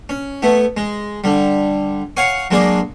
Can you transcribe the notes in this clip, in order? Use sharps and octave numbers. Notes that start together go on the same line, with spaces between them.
C#4
A3 B3 E4
G#3
D3 G3
C#5 F5 F#5 G#5 C#6
F#3 G#3 A#3 D4 G#4